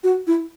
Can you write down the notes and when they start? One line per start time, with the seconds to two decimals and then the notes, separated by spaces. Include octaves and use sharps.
0.04 F#4
0.27 E4